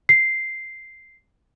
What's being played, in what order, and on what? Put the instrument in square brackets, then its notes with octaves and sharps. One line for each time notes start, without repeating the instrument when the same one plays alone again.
[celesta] C7